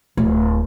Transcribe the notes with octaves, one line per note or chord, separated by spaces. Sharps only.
D1